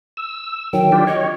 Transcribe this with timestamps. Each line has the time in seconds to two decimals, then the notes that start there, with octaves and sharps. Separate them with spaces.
0.17 E6
0.73 D#3 F#3 G5
0.92 D4 F4 G4
1.07 C#5 D#5